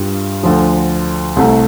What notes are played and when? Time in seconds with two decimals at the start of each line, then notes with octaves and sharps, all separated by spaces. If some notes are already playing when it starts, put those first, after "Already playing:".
Already playing: G2 G3 F4
0.43 D2 D3 F3
1.36 C2 C3 A3